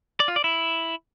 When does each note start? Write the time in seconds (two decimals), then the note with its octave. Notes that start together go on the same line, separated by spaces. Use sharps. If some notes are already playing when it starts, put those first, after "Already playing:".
0.20 D5
0.28 F4
0.36 D5
0.44 E4